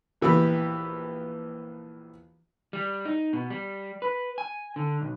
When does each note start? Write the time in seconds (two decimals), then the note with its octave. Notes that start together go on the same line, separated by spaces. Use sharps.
0.21 A#1 E3 B3 G4 B5
2.73 G3
3.05 D#4
3.33 B2
3.50 G3
4.02 B4
4.38 G#5
4.76 D3
5.02 B1